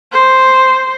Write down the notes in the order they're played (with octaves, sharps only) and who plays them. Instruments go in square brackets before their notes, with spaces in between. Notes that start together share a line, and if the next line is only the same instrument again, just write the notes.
[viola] C5